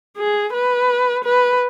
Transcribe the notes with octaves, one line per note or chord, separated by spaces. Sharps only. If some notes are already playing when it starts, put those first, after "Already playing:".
G#4
B4
B4